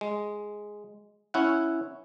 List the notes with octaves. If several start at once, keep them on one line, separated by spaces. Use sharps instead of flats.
G#3
C#4 E4 F#5